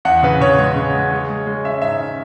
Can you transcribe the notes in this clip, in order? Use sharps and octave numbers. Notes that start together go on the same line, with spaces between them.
E2 F#5
C#3 B4
C#3 C#5
G#3
C#3
G#3
G#3
G#3
G#3
C#4 E5
G#2 E5
C#4